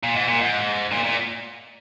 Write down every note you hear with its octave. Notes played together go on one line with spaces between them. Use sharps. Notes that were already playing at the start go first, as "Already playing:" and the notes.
A#2
G#2
A#2
G#2
A#2
A#2